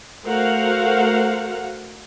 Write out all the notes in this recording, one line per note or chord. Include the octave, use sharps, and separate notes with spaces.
A3 F#4 A#4 C5 F5 F#5